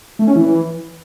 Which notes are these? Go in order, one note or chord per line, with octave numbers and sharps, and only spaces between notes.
A3
C#4
E3